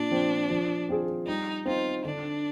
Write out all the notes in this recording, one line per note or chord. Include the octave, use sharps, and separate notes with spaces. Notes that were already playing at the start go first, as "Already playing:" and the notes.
Already playing: A#2 D4
F3 C4
F3
C4 F4 G#4
G3 D#4
C4 D#4 F4
D3 D4